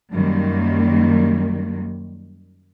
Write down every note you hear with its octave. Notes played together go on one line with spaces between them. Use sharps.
F#2 D#3 G3 A#3